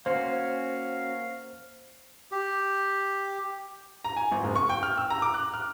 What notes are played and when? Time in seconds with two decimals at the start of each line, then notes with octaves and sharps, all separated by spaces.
0.06 A#3 C#4 F#4 C5 F5
2.32 G4
4.04 A#5
4.16 G#5
4.32 G#1
4.44 F#1
4.56 C#6
4.69 G5
4.83 F6
4.98 E6
5.10 A#5
5.22 D6
5.34 F#6
5.54 F6